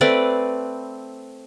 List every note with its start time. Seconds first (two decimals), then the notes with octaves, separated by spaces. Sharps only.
0.01 A3 C4 B4 D5